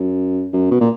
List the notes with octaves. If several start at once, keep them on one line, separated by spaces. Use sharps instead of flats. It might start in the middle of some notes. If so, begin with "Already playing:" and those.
Already playing: F#2
F#2
B2
A#2